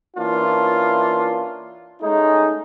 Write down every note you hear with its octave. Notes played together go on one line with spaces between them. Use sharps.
E3 A#3 C#4 D4 F4
G#3 A3 C#4 D#4